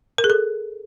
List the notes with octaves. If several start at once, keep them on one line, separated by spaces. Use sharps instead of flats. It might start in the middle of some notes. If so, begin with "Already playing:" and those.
A#4
G#4
A4